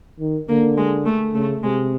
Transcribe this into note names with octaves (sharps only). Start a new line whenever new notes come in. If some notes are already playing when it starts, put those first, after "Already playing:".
D#3
D3 A#3
G#3
A3
C#3 A3
C3 G#3